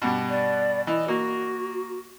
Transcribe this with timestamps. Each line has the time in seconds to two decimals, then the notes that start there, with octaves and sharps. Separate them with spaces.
0.02 G2 B2
0.30 D5
0.87 E3 D#5
1.08 A#3 F#4